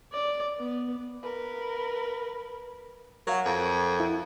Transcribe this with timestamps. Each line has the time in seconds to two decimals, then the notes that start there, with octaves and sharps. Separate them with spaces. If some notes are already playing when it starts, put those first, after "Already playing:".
0.12 D5
0.59 B3
1.23 A#4 B4
3.27 F#3 A#4 F5 F#5
3.45 F2
4.00 E4